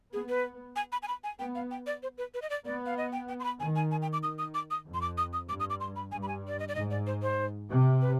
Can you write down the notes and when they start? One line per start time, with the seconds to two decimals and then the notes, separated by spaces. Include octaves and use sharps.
0.13 B3 G#4
0.29 B4
0.76 G#5
0.92 B5
1.02 G#5
1.08 B5
1.24 G#5
1.39 B3 G5
1.55 F5
1.71 G5
1.87 D5
2.03 C5
2.18 B4
2.34 B4
2.42 D#5
2.50 D5
2.65 B3 D5
2.86 F5
2.97 D#5
3.12 G5
3.28 G5
3.40 C6
3.44 B5
3.59 D#3 G#5
3.76 G#5
3.91 G#5
4.02 G5
4.13 D6
4.22 D#3 D#6
4.39 D#6
4.54 D6
4.71 D#6
4.86 F2
4.94 C6
5.02 D6
5.18 D#6
5.33 D#6
5.48 G2 D6
5.60 D#6
5.70 D6
5.80 C6
5.96 B5
6.12 G2 G#5
6.23 B5
6.28 G#5
6.48 D5
6.59 D#5
6.68 D5
6.75 G#2 D#5
6.91 D5
7.07 C5
7.22 C5
7.69 C3
8.01 B4